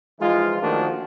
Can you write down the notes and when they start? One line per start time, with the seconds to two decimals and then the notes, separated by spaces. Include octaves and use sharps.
0.20 E3 F3 G#3 D#4 F4
0.62 D#3 F3 A3 A#3 D4 F#4